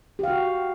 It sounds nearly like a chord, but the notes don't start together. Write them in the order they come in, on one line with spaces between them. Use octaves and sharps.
G4 F5 F#4